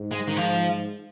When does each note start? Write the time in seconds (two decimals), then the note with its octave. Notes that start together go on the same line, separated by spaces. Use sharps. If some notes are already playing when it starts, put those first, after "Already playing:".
Already playing: G#2
0.12 G#3
0.28 D#3
0.36 F3